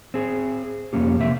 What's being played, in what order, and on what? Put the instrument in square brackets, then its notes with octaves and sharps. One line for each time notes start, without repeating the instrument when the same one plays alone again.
[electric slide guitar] C4 G#4
F2 A#3 C#4 G4
C3 A#3 E5